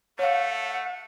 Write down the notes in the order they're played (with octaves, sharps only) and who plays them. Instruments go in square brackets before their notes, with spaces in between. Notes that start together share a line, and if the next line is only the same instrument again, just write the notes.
[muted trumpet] A3 [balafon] C#5 F5 [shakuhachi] F#5